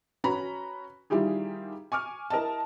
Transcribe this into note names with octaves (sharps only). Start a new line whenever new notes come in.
C#4 F#4 B4 A#5 B5
D#3 G3 E4 F4 G4 G#4
G#5 C#6 D6 F6
E4 A#4 D#5 A5